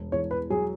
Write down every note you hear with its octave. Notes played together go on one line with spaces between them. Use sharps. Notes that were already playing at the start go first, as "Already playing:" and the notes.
Already playing: E1
E2 C#5
B4
F#3 G#4